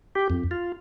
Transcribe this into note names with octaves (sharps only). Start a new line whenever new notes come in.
G4
F2
F4